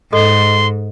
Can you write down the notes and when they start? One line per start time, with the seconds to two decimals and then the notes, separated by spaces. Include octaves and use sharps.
0.13 G#2 A4 D#5 C6